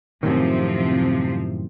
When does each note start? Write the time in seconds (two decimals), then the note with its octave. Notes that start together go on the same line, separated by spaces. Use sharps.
0.23 F#2 A2 C3 D#3 F3 C4